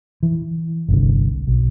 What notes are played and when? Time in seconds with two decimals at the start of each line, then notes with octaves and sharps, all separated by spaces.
0.23 E3
0.88 G1 C2 D3
1.47 B1